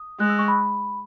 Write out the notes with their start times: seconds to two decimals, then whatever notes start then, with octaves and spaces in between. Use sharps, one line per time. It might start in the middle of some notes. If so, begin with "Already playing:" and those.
Already playing: D#6
0.20 G#3 F#6
0.30 E6
0.39 C#6
0.48 B5